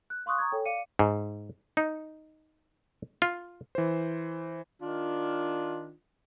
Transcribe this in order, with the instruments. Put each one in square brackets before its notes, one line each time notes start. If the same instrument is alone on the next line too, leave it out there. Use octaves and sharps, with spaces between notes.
[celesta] F#6
F5 C6 C#6 D#6 F#6
A#5 C#6 D#6 G#6
A4 C#5 G5 G#5
D5 F5 D6 C#7 D#7
[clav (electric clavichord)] G#2
D#4
F4
[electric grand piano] E3 C5
[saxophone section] D#3 D4 F4